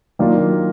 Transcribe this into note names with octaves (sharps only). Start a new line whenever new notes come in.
D#3 F#3 A#3 D4 F4